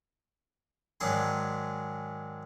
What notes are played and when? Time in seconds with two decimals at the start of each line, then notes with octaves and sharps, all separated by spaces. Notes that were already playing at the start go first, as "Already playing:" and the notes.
1.00 G#2 D#3 F#3 D4 G#4 C6